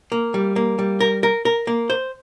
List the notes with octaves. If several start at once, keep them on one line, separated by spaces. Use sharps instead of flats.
A#3
G3
A#3
G3
A#4
A#4
A#4
A#3
C5